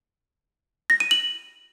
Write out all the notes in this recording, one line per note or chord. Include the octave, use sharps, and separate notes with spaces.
A#6
D#7
F#7